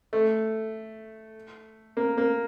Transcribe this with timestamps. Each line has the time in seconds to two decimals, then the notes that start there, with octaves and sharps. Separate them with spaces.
0.13 A3
1.97 A#3
2.18 A#3